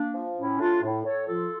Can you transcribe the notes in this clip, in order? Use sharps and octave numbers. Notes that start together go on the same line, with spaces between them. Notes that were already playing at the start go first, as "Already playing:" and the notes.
Already playing: A#3 D4
F3
A2 C#4 E4
A2 D4 F4
A2
A2 A4 C#5
F3 F4 A4